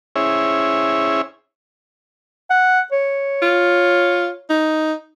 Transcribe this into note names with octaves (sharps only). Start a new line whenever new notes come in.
C#4 E4 G#4 C5 C#5 E5
F#5
C#5
F4
D#4